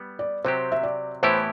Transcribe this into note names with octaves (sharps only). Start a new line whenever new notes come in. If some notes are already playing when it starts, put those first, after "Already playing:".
Already playing: G3 B3
D5
C3 F#3 C4 G4 C5
E5
D5
A2 E3 B3 E4 G4 C5